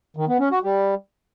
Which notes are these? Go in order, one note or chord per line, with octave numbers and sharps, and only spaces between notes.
D#3
B3
C#4
F#4
G3